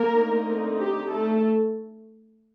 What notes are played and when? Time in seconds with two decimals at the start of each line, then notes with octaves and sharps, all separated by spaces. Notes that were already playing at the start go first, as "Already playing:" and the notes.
Already playing: A#3 A#4
0.11 D3 A3 C4 D#4
0.79 G4
1.12 A3 A4